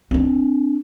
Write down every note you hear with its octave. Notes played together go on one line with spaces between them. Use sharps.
C4 D4